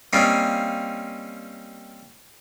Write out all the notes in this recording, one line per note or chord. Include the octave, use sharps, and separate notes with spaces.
G3 A#3 C4 C#4 D#4 F4